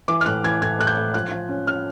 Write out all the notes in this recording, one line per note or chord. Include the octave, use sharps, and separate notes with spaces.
E3 D6
F6
A2 F#6
E3 G#6
A2 G#6
A2 F#6
G6
A2
F3 F#6
F3
C#4
C#4 F6